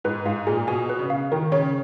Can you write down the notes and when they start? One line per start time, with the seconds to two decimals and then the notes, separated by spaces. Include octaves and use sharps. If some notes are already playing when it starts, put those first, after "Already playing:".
0.04 G#2 B4
0.25 G#2 F5
0.47 A#2 G#4
0.67 B2 G#5
0.89 B4
0.99 C#3
1.10 F5
1.32 D#3 A#4
1.52 C#3 C#5